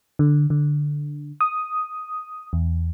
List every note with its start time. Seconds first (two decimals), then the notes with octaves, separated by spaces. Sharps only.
0.19 D3
0.50 D3
1.41 D#6
2.53 E2